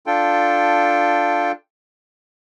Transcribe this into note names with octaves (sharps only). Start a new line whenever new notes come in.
D4 F4 A4 G5